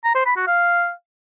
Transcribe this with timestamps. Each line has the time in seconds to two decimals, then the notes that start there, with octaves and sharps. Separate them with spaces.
0.04 A#5
0.15 C5
0.26 B5
0.36 F#4
0.47 F5